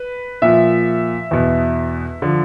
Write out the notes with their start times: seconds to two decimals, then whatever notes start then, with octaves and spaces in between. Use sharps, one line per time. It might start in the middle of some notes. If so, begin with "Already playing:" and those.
Already playing: B4
0.42 A#2 F3 E5
1.31 E2 B2
2.22 D3 F3